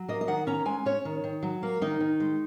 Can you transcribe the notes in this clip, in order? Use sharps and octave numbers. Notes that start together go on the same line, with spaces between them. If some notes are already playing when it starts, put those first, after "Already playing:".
Already playing: F#3
A#3 D#5
D#5
D#3 F#5
C#4 A#5
G#3 G#5
C#4 C#5
D#3
D#3
F#3
A#3
D#3 D#4
D#3
G#3